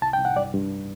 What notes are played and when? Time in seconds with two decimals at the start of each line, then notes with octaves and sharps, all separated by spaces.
0.02 C2 A5
0.13 G5
0.19 C2
0.25 F#5
0.36 G2 D5
0.54 G2